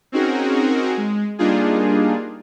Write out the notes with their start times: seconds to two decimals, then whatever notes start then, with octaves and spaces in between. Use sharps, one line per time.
0.12 C4 C#4 D#4 F#4 G#4 A#4
0.97 G#3
1.38 G3 A#3 D4 D#4 F4 G#4